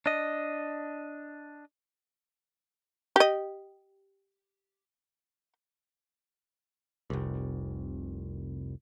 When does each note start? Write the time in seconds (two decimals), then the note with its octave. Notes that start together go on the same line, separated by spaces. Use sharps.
0.06 D4 D#5
3.16 G4 D#5
7.10 F1 C2